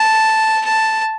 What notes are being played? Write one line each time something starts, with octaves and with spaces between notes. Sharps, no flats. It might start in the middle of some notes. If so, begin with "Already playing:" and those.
Already playing: A5
A5